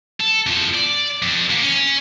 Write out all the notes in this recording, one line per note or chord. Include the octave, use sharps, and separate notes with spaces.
A4
E2 F3
D5
F2
A#3 B3
C#4